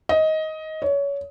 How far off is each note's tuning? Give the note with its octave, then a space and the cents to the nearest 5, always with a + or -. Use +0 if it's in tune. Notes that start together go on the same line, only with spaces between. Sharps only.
D#5 +15
C#5 +25